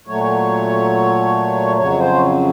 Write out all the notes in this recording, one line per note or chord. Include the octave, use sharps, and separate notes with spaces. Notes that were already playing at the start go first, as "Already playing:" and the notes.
A#2 F#3 A3 C#5
F2 C#3 F#3 C#5
C5